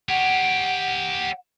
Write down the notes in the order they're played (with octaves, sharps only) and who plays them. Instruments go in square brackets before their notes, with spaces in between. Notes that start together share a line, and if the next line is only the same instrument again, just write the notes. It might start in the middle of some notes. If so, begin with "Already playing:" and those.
[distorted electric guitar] G4 C#5 [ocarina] F#5